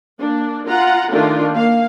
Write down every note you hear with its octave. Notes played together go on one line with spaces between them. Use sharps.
A#3 D4
F4 F#5 A#5
D#3 A3 D4 F4
A#3 F5